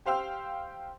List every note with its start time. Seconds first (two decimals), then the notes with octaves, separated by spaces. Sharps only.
0.06 G4 C5 F5 G5 E6